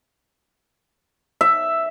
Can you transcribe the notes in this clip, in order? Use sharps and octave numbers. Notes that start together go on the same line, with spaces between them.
E5